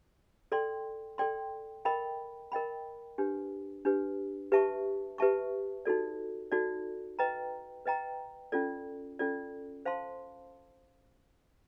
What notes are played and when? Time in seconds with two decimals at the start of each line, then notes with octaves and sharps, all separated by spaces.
0.52 A4 D5 G5 C6
1.18 A4 D5 G5 C6
1.85 A#4 D#5 G5 B5
2.52 A#4 D#5 G5 B5
3.18 D4 G4 B4
3.85 D4 G4 B4
4.52 G4 B4 E5 A5 C#6
5.18 G4 B4 E5 A5 C#6
5.85 D#4 F#4 A4 D5
6.52 D#4 F#4 A4 D5
7.19 B4 D#5 G5 A#5
7.86 B4 D#5 G5 A#5
8.52 C#4 F4 A4 D5
9.19 C#4 F4 A4 D5
9.85 C5 F5 A5 C6